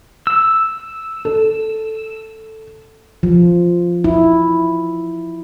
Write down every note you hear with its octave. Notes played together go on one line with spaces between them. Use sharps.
E6
A4
F3
E4